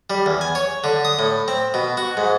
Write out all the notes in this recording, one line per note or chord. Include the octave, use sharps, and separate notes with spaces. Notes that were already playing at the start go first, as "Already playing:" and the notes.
G3
E2
G#5
C#5
D3
D#6
A2
C4
B2
F#4
G#2